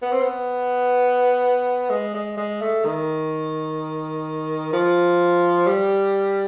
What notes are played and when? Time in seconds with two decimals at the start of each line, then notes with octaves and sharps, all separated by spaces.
0.02 B3
0.12 C4
0.21 B3
1.90 G#3
2.14 G#3
2.37 G#3
2.61 A3
2.84 D#3
4.73 F3
5.67 G3